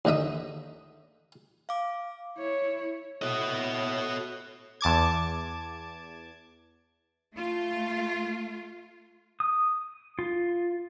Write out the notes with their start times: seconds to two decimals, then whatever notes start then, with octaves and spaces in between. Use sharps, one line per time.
0.05 D#2 D3 D#5 E5 D#6
1.69 F5 D6
2.38 E4 C#5
3.22 A2 F#4 D#5
4.81 E2 A5 D6 G#6
7.35 A3 F4
9.40 D#6
10.19 F4